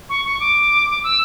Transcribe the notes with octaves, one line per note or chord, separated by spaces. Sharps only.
C#6
C#6
D6
E6